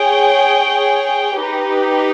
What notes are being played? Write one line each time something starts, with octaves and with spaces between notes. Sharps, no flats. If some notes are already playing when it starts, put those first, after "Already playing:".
Already playing: G#4 C#5 G5
D#4 G4 B4